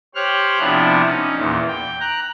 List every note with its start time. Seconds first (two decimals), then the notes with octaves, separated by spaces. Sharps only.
0.15 G4 C5 C#5 F6 F#6
0.59 C3 F3 B3 D4 E4
1.05 C#4 D#4
1.36 E2 A#2
1.68 G5
2.00 A#5 F#6